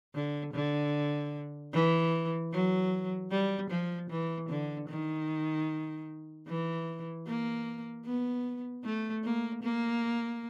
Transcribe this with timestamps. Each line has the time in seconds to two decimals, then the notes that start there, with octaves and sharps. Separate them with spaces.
0.15 D3
0.54 D3
1.73 E3
2.52 F#3
3.31 G3
3.70 F3
4.10 E3
4.49 D3
4.89 D#3
6.47 E3
7.27 A#3
8.05 B3
8.84 A3
9.24 A#3
9.63 A#3